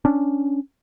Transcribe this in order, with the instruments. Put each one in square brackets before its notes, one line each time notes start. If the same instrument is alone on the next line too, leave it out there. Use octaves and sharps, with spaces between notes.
[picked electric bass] C#4 D4